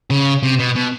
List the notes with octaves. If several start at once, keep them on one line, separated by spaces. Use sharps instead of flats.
C#3
C3
B2
B2